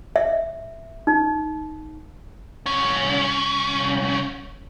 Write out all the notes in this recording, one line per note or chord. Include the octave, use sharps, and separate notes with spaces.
E5
D#4
C2 C#4